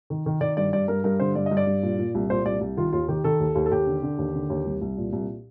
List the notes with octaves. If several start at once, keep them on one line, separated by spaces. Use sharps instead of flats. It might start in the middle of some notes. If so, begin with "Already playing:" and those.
D#3
D#3
D#3 D5
G2 D5
G2 D5
G2 A#4
G2 A#4
D3 C5
G2 D5
D#5
G2
D5
G2
A#2
A#2
C2
A#2 C5
C2 D5
C2
D#3 F4
D#2 F4
D#3 G4
D#3 A4
D#2
D#2
A4
D#2 G4
D3
D3
D#2
D3
D#2
C2
C2
A#2
C2